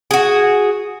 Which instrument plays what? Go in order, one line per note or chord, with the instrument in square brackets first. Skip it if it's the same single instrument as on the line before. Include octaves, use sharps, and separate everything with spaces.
[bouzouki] F#4 G#4